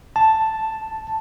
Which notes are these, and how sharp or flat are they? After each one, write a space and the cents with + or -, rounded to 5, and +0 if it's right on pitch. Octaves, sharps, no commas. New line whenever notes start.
A5 +0